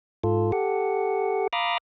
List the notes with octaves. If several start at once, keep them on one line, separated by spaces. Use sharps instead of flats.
G#2 F4 A4
G4 A4 F#5
F5 A#5 B5 D6 D#6 F6